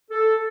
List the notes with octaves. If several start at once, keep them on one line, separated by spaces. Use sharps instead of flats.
A4